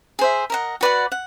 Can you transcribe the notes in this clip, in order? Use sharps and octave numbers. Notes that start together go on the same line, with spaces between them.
G#4 C5 E5
A#4 D#5 F#5
F#4 B4 D5 F#5
F#5